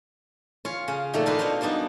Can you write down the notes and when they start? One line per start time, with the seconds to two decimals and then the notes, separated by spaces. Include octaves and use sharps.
0.65 C#4 F4 C#5
0.88 C#3 C#4
1.13 A#2 D#3 F3 A3 A#3 A4
1.26 D4 D#4 F4 A#4 B4
1.39 B2 D#4 C5 C#5 A#5 C6
1.61 F#2 G3 B3 D4 D#4